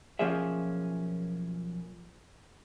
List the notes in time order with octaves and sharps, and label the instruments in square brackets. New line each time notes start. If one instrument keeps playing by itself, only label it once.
[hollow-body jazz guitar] B1 F3 A#3 C#4 G#4 E5